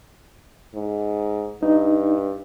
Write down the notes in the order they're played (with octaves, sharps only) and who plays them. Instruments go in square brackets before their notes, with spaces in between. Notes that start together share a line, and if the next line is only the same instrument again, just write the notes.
[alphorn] G#2
[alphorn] G2 [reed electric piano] D#4